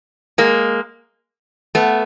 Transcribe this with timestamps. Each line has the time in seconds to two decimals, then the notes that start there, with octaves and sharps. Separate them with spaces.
0.38 G#3 A#3
1.75 A3 B3